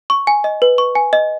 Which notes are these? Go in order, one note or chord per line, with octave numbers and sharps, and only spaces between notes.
C#6
G#5
D#5
B4
C#6
G#5
D#5